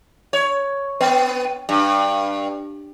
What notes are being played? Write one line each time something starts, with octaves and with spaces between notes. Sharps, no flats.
C#5
B3
G2